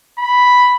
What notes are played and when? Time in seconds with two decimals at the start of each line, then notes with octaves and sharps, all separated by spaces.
0.19 B5